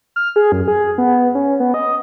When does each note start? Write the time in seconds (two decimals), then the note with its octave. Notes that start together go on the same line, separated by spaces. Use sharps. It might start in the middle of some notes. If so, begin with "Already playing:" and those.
0.16 F6
0.36 G#4
0.52 F#2
0.68 G#4
0.98 B3
1.35 C#4
1.60 B3
1.74 D#5